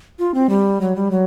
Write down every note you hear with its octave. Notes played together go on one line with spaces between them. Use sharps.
F4
C4
G3
F#3
G3
F#3